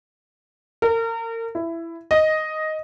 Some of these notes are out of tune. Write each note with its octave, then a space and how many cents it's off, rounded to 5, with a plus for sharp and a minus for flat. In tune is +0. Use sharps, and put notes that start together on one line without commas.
A#4 -35
E4 +15
D#5 +5